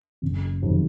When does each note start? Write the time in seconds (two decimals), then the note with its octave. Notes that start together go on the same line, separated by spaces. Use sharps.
0.22 F#1
0.62 F2 C3 D#3 F#3